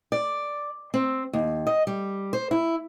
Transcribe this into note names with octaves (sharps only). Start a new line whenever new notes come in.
D5
C4
D#2
D#5
G3
C5
E4